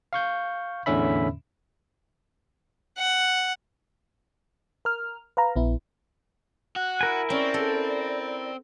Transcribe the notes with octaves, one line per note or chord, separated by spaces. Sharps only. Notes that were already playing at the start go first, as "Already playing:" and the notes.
F5 C#6 G6
E2 A2 D3 C#4 E5 B5
F#5
A#4 F6
B4 F5 A#5
A#1 B3 E4
F#4 F#6
E4 A#4 G#5
C4 C#4 D5
A4